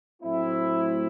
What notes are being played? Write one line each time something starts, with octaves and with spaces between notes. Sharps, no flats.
A2 F#3 A3 C4 E4